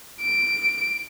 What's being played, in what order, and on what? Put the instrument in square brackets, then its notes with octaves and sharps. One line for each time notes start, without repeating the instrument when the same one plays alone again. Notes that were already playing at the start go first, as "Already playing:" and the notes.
[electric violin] D7